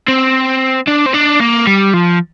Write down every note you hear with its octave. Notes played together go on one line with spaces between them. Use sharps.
C4
D4
C4
D4
A#3
G3
F3